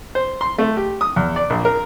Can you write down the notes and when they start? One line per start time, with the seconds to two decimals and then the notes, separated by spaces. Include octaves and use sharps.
0.15 C5
0.41 C6
0.58 A3
0.77 G4
1.01 D#6
1.16 E2
1.36 D5
1.50 A#1
1.65 A#4